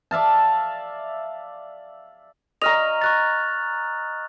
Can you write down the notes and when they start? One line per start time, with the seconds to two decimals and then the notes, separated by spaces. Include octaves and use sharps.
0.11 D5 E5 F5 A5
2.62 D#5 A#5 C#6 F6 F7
3.02 C#6 F#6 A6